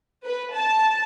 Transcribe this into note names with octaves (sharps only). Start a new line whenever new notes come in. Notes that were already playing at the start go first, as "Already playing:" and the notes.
B4
A5